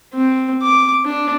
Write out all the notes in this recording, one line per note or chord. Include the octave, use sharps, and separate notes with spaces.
C4
D6
D4